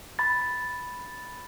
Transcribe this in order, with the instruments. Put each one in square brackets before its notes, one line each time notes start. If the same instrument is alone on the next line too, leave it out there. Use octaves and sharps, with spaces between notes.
[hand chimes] B5 A6